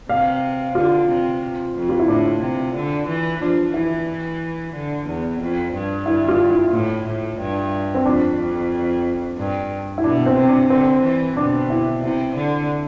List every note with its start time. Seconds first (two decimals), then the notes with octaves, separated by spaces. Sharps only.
0.09 C3 F5
0.75 D3 F4
1.08 C3
1.74 F2
1.89 F4
1.99 E4
2.08 A2 D4
2.42 C3
2.75 D3
3.08 E3
3.40 F3 D4
3.74 E3 E4
4.74 D3
5.07 E2
5.40 F2
5.74 G2
6.06 E4
6.28 F4
6.51 E4
6.72 A2
7.06 A2
7.39 G2
7.94 C4
8.05 F2 D4
9.38 G2
9.98 E4
10.04 B2 D4
10.26 C4
10.37 C3
10.49 D4
10.70 D3 C4
11.03 E3
11.37 B2 D4
11.70 E4
12.03 C3 E4
12.36 D3